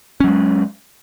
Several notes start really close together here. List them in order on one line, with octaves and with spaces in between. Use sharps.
C#4 F#3 G#3